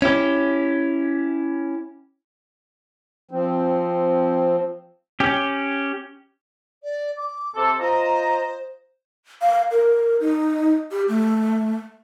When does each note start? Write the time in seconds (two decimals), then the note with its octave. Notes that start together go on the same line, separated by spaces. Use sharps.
0.02 C#4 E4 G4
3.31 F3 C4
5.20 C#4 G4
6.83 D5
7.16 D6
7.55 C3 A4
7.79 F4 C5 D#5 A#5
9.42 F5
9.71 A#4
10.20 D#4
10.91 G4
11.08 A3